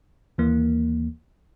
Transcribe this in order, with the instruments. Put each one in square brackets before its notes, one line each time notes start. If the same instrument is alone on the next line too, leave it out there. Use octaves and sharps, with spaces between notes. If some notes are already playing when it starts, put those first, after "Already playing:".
[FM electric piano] D#2 E3 A#3